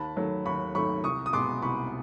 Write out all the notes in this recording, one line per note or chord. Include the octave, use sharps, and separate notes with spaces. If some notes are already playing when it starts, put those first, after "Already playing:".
Already playing: D#2 A5 B5
D#3 F#3 A3
D#2 B5 C#6
D#3 F#3 A3 B5 C#6
C2 C#6 D#6
D#6
B2 G#3 B3 C6 D6
C2 B5 C#6